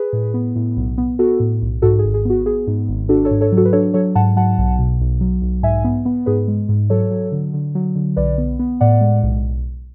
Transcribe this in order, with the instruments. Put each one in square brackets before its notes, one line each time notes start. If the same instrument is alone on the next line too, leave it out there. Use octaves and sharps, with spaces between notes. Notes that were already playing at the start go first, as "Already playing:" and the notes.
Already playing: [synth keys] G#4 B4
A2
B3
A2
B1
B3
B3 F#4 A4
A2
B1
G#2 F#4 A4
G#4
G#1
G#4
B3 F#4
B3 G#4
G#2
G#1
D4 F#4 A4
A4 C#5
G#2
A4 C#5
F#3
F#4 A4
B4
D4 A4 C#5
F#3 A4 C#5
G#2 F#5 A5
F#3 F#5 A5
B1
B2
B1
F#3
B1
G#2 E5 G#5
B3
B3
G#2 G#4 B4
G#3
G#2
F#3 A4 C#5
F#3
D3
D3
F#3
D3
B1 B4 D5
B3
B3
A2 D5 F#5
G#3
B1